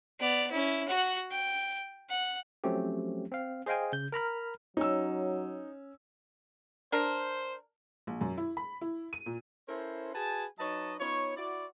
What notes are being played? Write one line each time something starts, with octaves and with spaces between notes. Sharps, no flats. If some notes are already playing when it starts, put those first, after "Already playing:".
B3 D5
C#4 E4
F#4 F#5
G5
F#5
F3 F#3 A3 C4 C#4 G4
C4 F5
G#4 C5 D#5 F5 G5 G#5
C#3 G6
A#4 A#5 B5 F6
F#3 C#4 D#4 E6
D4 A#4 C5
A#1
F#2
E4
B5
E4
D#7
A#2
C#4 E4 A4 A#4 C5
F#4 G#4 B4 G#5 A5
F#3 D#4 B4 C#5 D#5 A5
B3 D#4 F4 C#5
E4 F#4 D5